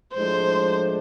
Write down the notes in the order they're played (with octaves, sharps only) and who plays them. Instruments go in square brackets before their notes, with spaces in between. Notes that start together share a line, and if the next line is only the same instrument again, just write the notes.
[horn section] A2 F3 G#3 D4 [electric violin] C5